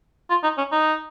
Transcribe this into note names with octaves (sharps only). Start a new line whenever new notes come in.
F4
D#4
C#4
D#4